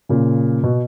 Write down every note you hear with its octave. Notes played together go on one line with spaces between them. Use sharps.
A#2 C#3
B2